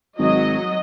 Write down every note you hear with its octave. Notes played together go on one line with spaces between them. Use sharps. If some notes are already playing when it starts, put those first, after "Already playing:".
G#1 F#3 D#5